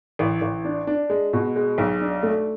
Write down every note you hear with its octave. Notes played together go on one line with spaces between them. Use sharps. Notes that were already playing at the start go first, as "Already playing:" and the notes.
A1
A1
D4
D4
G#3
B2
G#3
B1
D4
A3